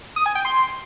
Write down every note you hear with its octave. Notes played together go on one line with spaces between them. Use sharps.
D#6
G#5
G5
C6